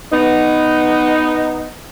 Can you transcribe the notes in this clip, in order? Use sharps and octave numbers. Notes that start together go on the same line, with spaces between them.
B3 D#4